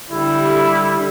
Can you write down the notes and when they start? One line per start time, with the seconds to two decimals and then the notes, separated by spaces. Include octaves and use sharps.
0.10 D3 G3 E4